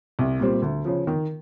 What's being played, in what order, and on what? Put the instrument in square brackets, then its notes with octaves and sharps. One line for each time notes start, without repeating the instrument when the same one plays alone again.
[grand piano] C2
A#2 G3 C4
D2
C#3 F3
D#3